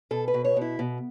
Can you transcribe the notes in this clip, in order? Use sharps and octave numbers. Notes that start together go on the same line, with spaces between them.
B2 A4
B4
B2
C#5
B2 E4
B2